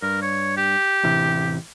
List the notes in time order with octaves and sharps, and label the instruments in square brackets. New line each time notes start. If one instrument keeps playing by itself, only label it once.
[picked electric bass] G2 [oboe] A#4
[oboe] C#5
G4
[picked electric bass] A1 C3 E3